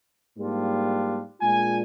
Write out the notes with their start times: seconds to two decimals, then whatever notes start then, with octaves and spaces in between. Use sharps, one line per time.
0.37 G#2 G3 A#3 D4 F4
1.41 A#2 G#3 D4 F4 G#5